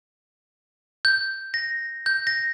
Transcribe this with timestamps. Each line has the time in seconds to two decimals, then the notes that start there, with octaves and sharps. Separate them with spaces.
1.05 G6
1.54 A#6
2.06 G6
2.27 A#6